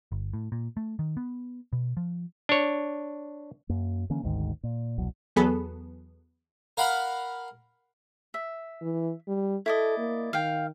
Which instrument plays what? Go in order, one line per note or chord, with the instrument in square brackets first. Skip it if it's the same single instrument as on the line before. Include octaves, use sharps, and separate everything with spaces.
[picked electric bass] G1
A2
A#2
A3
D#3
B3
B2
F3
[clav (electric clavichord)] D4 C#5
[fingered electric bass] F#2 A#3
D3 E3 A#3 C#4
G#1 D2 G#2 D#3
A#2
E1 C2 B2 F#3
[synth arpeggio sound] E2 F#3 B3 G#4 A4 B5
[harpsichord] A#4 F5 F#5 B5
[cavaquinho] E5
[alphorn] E3
G3
[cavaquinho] E4 D5 D#5 [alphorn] A4
[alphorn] A#3
[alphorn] D#3 [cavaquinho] F5 G5